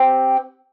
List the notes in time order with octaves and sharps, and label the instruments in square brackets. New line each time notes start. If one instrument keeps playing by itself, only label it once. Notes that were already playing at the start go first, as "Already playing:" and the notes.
Already playing: [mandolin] C4 G4